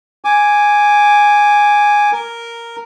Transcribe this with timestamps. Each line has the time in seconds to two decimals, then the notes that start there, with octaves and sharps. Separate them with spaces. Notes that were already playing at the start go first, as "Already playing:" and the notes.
0.25 G#5 D6
2.12 A#4